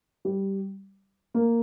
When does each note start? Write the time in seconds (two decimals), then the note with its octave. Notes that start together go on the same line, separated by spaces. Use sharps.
0.25 G3
1.34 A#3